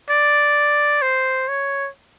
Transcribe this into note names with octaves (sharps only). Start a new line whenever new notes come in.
D5
C5
C#5